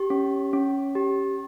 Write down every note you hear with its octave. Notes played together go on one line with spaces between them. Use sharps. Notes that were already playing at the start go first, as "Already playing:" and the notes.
Already playing: G4 C#6
C#4
C#4
G4